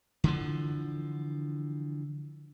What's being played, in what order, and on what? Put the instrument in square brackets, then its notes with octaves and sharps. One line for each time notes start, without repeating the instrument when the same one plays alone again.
[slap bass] D3 E3 F3